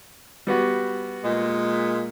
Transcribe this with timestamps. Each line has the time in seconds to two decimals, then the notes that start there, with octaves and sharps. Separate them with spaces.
0.47 G3 B3 F#4
1.25 A#2 G#3